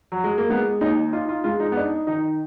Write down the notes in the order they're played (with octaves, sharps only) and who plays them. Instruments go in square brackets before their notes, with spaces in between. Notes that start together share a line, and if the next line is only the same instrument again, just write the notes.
[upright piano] F#3
G#3
A#3
[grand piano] G#3 [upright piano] B3
[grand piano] D#2 [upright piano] D#4
[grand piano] D#4 [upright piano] F4
[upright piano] F4
[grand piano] G#3 [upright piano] F4
[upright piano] D#4
B3
[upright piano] D4 [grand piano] D#4
[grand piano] D#3 [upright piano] D#4